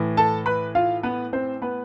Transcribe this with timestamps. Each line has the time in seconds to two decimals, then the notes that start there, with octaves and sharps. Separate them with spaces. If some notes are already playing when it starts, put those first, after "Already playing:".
Already playing: A2 E3
0.17 A4 A5
0.46 B4 B5
0.75 F4 F5
1.03 B3 B4
1.33 C4 C5
1.62 B3 B4